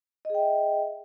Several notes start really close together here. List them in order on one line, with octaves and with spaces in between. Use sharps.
D#5 G#4 G5 E5